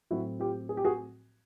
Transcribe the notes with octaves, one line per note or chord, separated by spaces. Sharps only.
A2 F#3 A3 C4 E4 F#4
F4 G4
G#4
G4
F#4 G#4